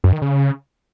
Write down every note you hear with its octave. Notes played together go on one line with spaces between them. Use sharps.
F#2
D#3
C#3